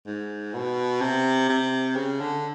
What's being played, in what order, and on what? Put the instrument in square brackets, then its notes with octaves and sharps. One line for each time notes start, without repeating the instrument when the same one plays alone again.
[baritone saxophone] G#2
B2
C3
C3
C#3
D3